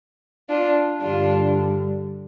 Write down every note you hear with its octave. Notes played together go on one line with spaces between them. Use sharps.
D4 F4
G2 D3 G3 D4 F4